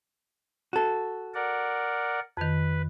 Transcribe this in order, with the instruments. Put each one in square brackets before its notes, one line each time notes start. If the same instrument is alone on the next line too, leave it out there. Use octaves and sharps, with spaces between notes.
[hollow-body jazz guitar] F#4 A4
[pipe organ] A#4 D5 F#5
[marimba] F2 D#3 [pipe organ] B4